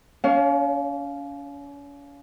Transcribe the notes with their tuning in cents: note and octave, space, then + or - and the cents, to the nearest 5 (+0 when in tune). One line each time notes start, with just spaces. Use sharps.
C#4 +40 C#5 +0 F5 +0